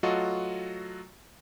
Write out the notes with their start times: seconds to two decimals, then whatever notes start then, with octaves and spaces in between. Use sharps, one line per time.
0.03 F#3 A3 F4 F#4 A4 D#5